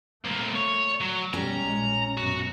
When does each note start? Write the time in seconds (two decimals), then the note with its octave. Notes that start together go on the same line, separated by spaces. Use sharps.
0.25 C2 A#2 A3
0.56 C#5
1.01 F#3
1.34 B2 G3 C#4 A#5
1.64 A#1 G#3
2.18 F#2 B2 F#4